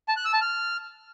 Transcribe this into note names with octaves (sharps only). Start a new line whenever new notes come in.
A5
F#6
E6
A5
F6